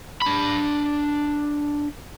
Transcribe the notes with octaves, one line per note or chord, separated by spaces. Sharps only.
D4 B5